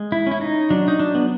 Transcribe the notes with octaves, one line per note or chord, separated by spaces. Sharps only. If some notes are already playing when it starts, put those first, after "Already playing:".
Already playing: G#3
E4
C#4 E4
D#4
F#3 D4
D#4
D4
B3